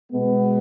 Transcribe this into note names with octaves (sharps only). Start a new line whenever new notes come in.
B2 G#3 B3